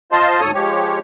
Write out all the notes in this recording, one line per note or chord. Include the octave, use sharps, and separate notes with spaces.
F4 C5 D#5 A5 C6
D2 G#2 A4 C#5 D#6
F3 G#3 G4 C#5